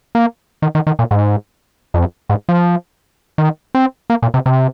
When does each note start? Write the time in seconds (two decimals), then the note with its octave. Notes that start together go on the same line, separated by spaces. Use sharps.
0.15 A#3
0.62 D#3
0.75 D#3
0.87 D#3
0.99 A#2
1.11 G#2
1.94 F2
2.29 G#2
2.49 F3
3.38 D#3
3.75 C4
4.10 A#3
4.22 A#2
4.34 C3
4.46 C3